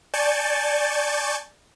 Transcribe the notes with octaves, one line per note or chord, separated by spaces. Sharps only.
D5 G#5 A5 C#6 G6 A6